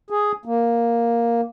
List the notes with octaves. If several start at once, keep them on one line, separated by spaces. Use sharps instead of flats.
G#4
A#3